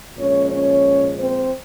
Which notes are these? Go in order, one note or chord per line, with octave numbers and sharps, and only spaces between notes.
A#2 F3 G#3 C#4 C#5
C#4 C#5
C4 C5